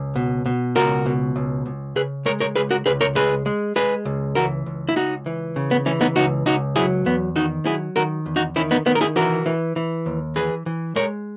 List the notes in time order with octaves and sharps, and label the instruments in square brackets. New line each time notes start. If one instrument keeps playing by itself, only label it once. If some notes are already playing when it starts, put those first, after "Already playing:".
Already playing: [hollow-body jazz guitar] C#2
B2
B2
C#2 F#4 A#4
B2
C#2
C#2
C#3 G#4 B4
G#3 A#4 C#5
A#4 C#5
C#2 G#4 B4
F#4 A#4
C#2 G#4 B4
A#4 C#5
G#3 G#4 B4
G#3
G#3 G#4 B4
C#2
E3 F#4 A#4
C#2
E4
C#2 D#4 F#4
E3
C#3
B3
E3 C#4
B3 D#4
C#2 D#4 F#4
C#2 D#4 F#4
F#3 E4 G#4
E2 B3
D#3 D#4 F#4
F#3 E4 G#4
D#3 F#4 A#4
E2
D#4 F#4
D#3 C#4 E4
B3 D#4
D#3 B3
A#4
E4 G#4
E3 F#4 A#4
E3
E3
D#2
E3 G#4 B4
E3
G#3 A#4 C#5